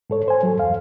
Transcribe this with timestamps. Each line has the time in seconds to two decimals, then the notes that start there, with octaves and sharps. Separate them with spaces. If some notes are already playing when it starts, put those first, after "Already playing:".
0.10 G#2 A4 C#5
0.28 C5 G#5
0.43 F#3 A4
0.57 E2 G2 F5